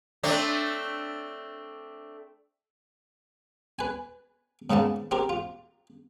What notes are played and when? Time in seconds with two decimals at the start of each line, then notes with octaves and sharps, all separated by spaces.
0.23 A3 C4 D4
3.79 B4 G#5
4.70 G#2 C#3 A#3 B3 A5
5.11 C4 G4 A#4
5.29 F4